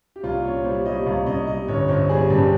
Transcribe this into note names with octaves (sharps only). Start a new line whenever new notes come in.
G4
C2 F4
A#2 C#5
G3 C5
G3 D#5
C2 F5
C2 D#5
G3 D#5
G1 C#5
G1 C5
G3 G#4
G2 G4